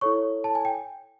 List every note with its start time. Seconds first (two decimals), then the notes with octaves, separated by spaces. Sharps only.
0.01 E4 A4 C#5 C#6
0.44 A5
0.55 G#5
0.65 G5